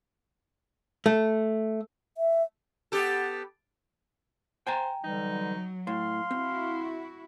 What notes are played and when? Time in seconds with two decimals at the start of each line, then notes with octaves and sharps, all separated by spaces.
1.06 A3
2.17 E5
2.92 B3 G4 A4
4.67 C5 G5 G#5 A#5
5.04 D3 E3 F#3 G3 D#4
5.87 A2 F5 C6
6.31 C4 E4 F#4